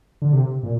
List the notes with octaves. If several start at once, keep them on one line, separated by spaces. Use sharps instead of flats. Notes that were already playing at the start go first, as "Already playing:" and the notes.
D3
C3
A#2